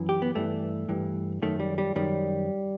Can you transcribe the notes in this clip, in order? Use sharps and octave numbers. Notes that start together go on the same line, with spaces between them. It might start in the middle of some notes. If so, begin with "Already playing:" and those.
Already playing: F#2 E3
G4
B3
G2 E3 A3
G2 E3
F#2 D#3 A3
G3
G3
F#2 D#3 G3